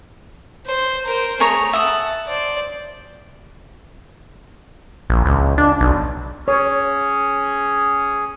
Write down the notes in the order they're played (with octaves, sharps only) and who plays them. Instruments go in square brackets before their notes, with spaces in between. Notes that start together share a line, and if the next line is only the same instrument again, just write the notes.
[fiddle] C5
A#4 C5
[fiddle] A3 [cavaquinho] G#4 C#5 A#5
[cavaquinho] E5 D#6 [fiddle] F#5 A5
[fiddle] C5 D5
[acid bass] A#1
C#2
D4
B1
[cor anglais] C#4 [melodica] G#4 [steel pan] C#5